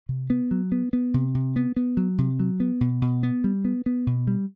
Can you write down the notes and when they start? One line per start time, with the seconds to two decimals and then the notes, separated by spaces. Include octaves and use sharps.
0.09 C3
0.30 B3
0.51 F#3
0.72 B3
0.93 B3
1.14 C3
1.35 C3
1.56 B3
1.76 B3
1.97 F#3
2.18 C3
2.39 F#3
2.60 B3
2.81 B2
3.02 B2
3.23 B3
3.44 G3
3.65 B3
3.86 B3
4.07 B2
4.27 G3